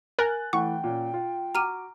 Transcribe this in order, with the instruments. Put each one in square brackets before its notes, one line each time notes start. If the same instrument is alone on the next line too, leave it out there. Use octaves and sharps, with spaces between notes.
[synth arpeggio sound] A#4 [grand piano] G#5 F#6 A6
[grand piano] E3 A3 [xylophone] F#5 [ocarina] G5 [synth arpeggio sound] C#6
[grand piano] A#2 C#4
F4
[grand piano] F#4 D6 [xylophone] A#5 F6 D#7